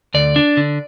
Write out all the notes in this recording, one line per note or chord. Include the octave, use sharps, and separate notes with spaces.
D2 D5
D4
D3